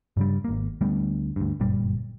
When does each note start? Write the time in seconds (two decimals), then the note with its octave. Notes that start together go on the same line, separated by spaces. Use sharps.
0.17 G2 C#3 G3
0.44 G#1 A#3
0.81 D2 G3 A3 B3
1.36 D2 G2
1.60 G1 F#2 A#2 G3